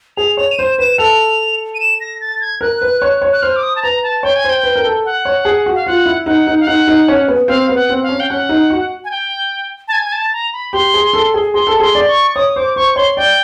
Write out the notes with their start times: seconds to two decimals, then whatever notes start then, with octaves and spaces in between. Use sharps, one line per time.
0.17 G#4 F7
0.37 C#5 F7
0.52 D#7
0.58 C5 E7
0.78 B4 E7
0.98 A4 F7
1.75 D#7
1.80 E7
2.00 A#6
2.21 A6
2.41 G#6
2.61 A#4 F#6
2.81 B4
3.02 C#5
3.22 C#5
3.33 F#6
3.42 C5 F6
3.56 D6
3.63 D#6
3.76 A5
3.83 B4 A#5
4.03 A5
4.23 C#5 G5
4.36 G#5
4.44 C5
4.50 G5
4.64 B4
4.75 A#4
4.84 A4
5.05 F#5
5.25 C#5
5.45 G#4
5.66 F#4
5.75 F5
5.86 F4 F#5
6.06 E4
6.26 D#4 F#5
6.47 D#4
6.60 F5
6.67 D#4 F#5
6.87 D#4
7.08 C#4
7.28 B3
7.48 C4 F5
7.69 B3
7.75 F#5
7.89 C4
8.03 F5
8.09 C#4
8.20 G5
8.29 C#4 F#5
8.49 D#4
8.70 F#4
9.04 G#5
9.11 G5
9.88 A5
9.93 G#5
10.05 G#5
10.12 A5
10.33 A#5
10.53 B5
10.73 G4 C6
10.94 G#4
11.13 A4
11.34 G#4
11.54 G#4 C6
11.67 A4
11.77 B5
11.80 G#4 C6
11.95 D5
12.08 C#6
12.35 C#5 D#6
12.56 C5 D6
12.76 C5 C#6
12.96 C#5 C6
13.17 D5 G5